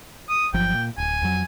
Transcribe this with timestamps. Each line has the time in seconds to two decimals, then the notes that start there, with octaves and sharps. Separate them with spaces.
0.29 D#6
0.54 G1 F3 F#3 G5
0.74 A#2
0.98 D1 G#5
1.23 F2 F#3